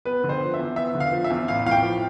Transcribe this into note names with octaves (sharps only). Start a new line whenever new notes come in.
B3 B4
D3
C5
F3
E5
E2
B3 E5
D3
F5
F3
E5
E2
A1 F5
A2 F5
G5
F3